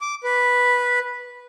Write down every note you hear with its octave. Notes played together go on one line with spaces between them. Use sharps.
D6
B4